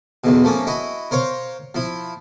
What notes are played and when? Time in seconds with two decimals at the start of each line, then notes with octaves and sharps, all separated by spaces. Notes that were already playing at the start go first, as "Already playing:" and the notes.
0.24 B1 E2 B2
0.44 F3 A3 A#3 C#4
0.67 E4 F#4 D#5
1.11 A#4 C5 C#5 F5
1.75 F3 E4